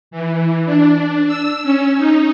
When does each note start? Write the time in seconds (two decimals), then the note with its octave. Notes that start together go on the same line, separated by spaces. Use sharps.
0.11 E3
0.66 D4
0.95 D4
1.27 E6
1.64 C#4
1.98 D#4